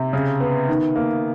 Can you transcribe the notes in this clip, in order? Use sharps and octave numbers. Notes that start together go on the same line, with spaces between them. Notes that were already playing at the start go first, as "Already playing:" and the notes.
Already playing: C3
C#3
B3
D#3
A#3